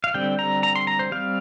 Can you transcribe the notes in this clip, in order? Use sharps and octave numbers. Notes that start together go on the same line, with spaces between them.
F5
D3 G3 C4 G5
A#5
A#5
C6
A#5
C5
G3 C4 F5